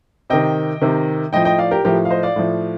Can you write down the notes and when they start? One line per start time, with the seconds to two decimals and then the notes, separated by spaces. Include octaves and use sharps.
0.30 C3 D#3 D#5 G5
0.82 C3 D#3
1.33 A2 F3 D#5 G5
1.45 D#5 G5
1.59 D5 F5
1.71 G4 A#4
1.84 A2 F3 G4 A#4
2.05 F5
2.10 C5 D#5
2.23 D5 F5
2.36 A2 F3